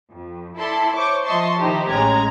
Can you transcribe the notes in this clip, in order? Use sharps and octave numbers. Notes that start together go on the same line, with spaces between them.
F2
E4 A4 D5 A5 B5 C6
C5 C#5 C#6 D6
F3 D#5 E5 A5 C6 C#6
D#3 D#4 E4 G4 C5
A1 G#3 C#4 A#5 G#6